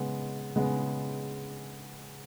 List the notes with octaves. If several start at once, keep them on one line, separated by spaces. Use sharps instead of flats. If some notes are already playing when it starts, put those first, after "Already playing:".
Already playing: C#3 G#3 B3
C#3 G#3 B3